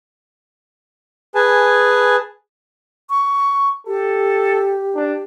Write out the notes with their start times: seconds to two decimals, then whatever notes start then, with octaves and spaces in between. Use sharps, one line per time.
1.35 G#4 B4 G#5 A5
3.10 C#6
3.87 G4 A4
4.95 D4